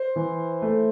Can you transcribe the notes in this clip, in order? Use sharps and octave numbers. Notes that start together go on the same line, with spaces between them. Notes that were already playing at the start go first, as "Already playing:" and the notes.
Already playing: C5
E3
A3